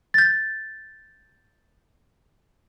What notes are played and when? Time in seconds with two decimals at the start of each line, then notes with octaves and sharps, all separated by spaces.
0.14 G6 A6